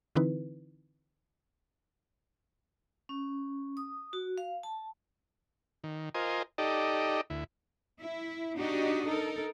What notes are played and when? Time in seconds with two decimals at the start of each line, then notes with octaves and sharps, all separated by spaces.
0.16 D3 E3 C4 D#4 E4 B4
3.09 C#4
3.77 D#6
4.13 F#4
4.38 F5
4.63 A5
5.84 D#3
6.15 F4 A#4 C5 D#5 G#5
6.58 D#4 G4 A4 D5 D#5
7.30 D2 E4
7.99 E4
8.56 D4 D#4 F#4 G4 D#5
9.06 D#4 A4 A#4